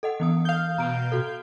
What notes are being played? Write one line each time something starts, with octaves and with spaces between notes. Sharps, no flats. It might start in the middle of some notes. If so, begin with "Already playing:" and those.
A4 D#5 F#5
E3 B3 D#6
F5 G6
B2 A#5 D7
F#4 A4